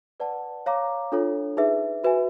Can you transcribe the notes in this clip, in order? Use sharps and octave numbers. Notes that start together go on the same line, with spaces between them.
B4 D5 F#5 A5
C#5 F5 A#5 D6
D4 F4 A4 C#5
D#4 G#4 B4 E5
F#4 B4 E5 G#5